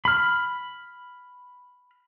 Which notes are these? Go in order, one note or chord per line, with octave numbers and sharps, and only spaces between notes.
B5 F6